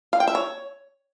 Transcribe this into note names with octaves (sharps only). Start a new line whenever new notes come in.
F5
G5
E5
C#5